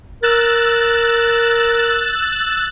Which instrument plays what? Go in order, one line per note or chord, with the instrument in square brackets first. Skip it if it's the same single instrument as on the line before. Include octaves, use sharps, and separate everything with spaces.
[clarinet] A#4 [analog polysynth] E6 F#6 A6